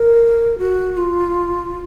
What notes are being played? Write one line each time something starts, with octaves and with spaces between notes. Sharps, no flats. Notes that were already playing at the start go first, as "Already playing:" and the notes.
Already playing: A#4
F#4
F4